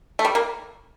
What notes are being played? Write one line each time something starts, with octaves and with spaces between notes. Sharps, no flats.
A3
G3
A#3